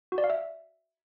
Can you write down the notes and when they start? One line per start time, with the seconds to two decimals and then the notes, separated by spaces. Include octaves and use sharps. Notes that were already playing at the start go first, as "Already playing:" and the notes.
0.12 F#4
0.18 D5
0.24 F5
0.30 E5